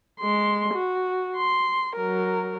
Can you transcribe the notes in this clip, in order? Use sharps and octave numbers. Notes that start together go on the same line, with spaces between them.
G#3 C6
F#4
C6
F#3 A#4